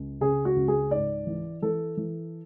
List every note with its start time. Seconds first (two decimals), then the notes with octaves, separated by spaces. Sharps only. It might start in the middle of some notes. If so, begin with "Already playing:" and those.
Already playing: C#2
0.21 C#3 G#4
0.45 F#4
0.57 C#2
0.68 G#4
0.91 G#2 D5
1.27 E3
1.62 E3 A4
1.97 E3